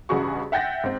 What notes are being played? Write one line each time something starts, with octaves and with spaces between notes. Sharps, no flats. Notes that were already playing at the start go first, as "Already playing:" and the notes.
A1 G2 C#3 F#4 G#4 C#6
E5 F#5 G5 G6 A6 A#6
G#2 C4